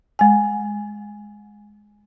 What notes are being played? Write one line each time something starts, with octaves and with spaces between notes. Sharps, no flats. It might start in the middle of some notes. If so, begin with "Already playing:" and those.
G#3 G#5